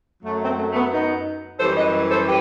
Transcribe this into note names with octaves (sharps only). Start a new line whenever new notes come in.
F#2 F#3 A3
A3 C4
A3
A3
B3
B3 D#4
F#2 E3 G3 A4 C5
B4 D#5
A4 C5
G4 B4